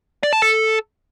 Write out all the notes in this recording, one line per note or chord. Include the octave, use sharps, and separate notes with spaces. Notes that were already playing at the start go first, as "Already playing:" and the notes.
D5
A5
A4